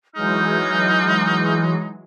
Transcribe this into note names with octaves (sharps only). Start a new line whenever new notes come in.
E3 F#3 G#3 D#4 F6 G6